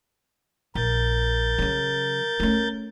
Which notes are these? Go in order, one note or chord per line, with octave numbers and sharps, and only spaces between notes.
A#1 A#4 G6 A6
C#3 F#3
A3 C#4